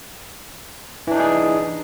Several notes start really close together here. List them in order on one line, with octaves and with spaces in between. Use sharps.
E3 D4 D#4 G#4